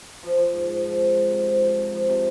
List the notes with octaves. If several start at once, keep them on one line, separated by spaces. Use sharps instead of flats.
F3
F3
G#2
G#2
F3
C4
G#3
C3
F3
F3
C3
F3
C3